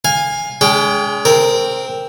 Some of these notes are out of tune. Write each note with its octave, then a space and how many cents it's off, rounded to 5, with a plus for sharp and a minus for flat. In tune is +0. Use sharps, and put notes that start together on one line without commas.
F5 +15 G#5 -15
G#3 +0 C#4 +45 G5 +0
C4 +0 A#4 +0